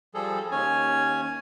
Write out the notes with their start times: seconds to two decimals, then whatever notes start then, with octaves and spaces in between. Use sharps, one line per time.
0.14 F3 G3 G#4 A4
0.51 D#2 C#4 C#5 G#5